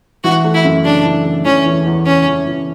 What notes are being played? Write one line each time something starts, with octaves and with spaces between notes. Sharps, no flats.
E3 F#4
A3
E4
F#2
C#3 D4
E3
A3
E3 C#4
E2
E2
C#3 C#4
E3
E2